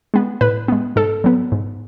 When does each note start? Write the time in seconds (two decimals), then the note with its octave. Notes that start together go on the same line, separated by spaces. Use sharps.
0.14 G#3 B3
0.41 A2 B4
0.68 G#3 B3
0.96 G#2 A4
1.24 F#3 B3
1.52 G#2